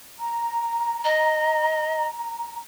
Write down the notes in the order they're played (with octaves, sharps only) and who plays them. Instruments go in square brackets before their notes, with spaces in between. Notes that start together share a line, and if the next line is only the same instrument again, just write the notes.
[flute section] A#5
[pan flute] D#5